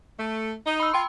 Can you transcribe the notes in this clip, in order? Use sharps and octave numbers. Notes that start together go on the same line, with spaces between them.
A3
D#4
B5 E6
F4 G5 C6